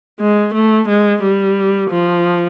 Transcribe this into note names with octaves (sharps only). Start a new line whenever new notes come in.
G#3
A3
G#3
G3
F3